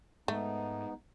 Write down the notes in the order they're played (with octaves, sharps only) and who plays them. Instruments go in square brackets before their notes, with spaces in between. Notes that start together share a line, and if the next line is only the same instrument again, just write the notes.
[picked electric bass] G#2 G#3 [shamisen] A3 [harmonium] B3 D#4